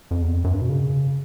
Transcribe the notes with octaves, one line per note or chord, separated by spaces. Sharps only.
F2
E2
F2
F#2
G2
B2
C#3